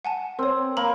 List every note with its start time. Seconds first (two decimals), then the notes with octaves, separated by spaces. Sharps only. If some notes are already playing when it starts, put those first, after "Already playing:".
0.05 F#5 G#5 A5
0.39 C4 A#4 C#5
0.77 A#3 A#5 B5 F#7